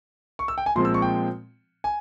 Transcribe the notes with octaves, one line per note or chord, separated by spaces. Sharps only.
C#6
E6
G5
G#5
A#2 F3 G#3 C4 C6
E6
C#6
G5
G#5